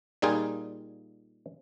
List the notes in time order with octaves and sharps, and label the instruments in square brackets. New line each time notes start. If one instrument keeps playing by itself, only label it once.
[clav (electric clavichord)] A#2 G3 D#4 F4 G#4